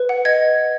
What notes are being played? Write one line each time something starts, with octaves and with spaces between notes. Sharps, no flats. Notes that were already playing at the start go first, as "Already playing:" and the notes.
Already playing: B4
F#5
D#5 G#6